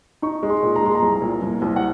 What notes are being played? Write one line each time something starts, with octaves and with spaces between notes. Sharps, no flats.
D#4 C#6
G#3
C6
A#2
A#5
G#3 C6
A#5
C2
A#2
C2
C2
F#5